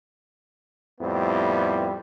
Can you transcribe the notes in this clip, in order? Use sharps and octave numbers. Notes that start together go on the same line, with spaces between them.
F2 A2 G3 B3 C4 E4